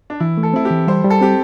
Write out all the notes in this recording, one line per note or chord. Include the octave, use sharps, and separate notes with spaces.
D4
E3 E4
A3
A4
C4 E4
G4
E3
G3 C5
G3
A4
C4 G4